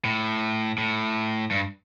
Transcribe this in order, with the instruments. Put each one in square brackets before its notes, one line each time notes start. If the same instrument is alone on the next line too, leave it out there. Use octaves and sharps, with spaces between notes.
[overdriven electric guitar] A2
A2
G2